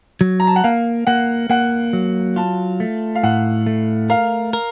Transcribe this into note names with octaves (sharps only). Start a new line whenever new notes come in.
F#3
A#5
A5
F#5
A#3 F5
A#3 F#5
A#3 F#5
F#3
F4 A5
A3
F5
A2 F#5
A3
A#4 F5
A#4